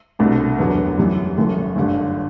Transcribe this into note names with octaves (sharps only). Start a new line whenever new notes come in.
C2 B2 A3 D4
F#1 E2 D3 F#3 B3
F#2 E3 G3
F#1 F#2 E3 A3
G1 G2 D3